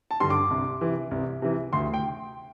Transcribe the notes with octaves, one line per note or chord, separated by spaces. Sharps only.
A5
G2 D3 C6
D6
C2
C3 E3
C2
C3 E3
D2 C6
G5